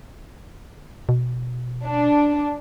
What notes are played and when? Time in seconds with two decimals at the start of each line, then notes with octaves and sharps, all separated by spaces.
1.09 B2
1.86 D4